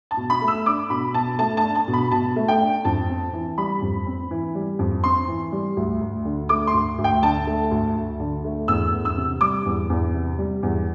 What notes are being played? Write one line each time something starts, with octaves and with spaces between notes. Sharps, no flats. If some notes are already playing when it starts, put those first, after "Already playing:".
A5
B2
B5
A3
E6
D4 D6
B2 B5
B2 A5
A3 A5
A5
D4
A5
B2
B5
B2 A5
A3
G5
D4
F2 A5
C4
E3
G3 B5
F2
C4
E3
G3
F2
C4 C6
E3
G3
D2
D2
D3
A3 D6
C6
D2
D2
G5
D3 A5
A3
D2
D2
D3
A3
E2 E6
E2
E6
C3
G3 D6
E2
E2
C3
G3
E2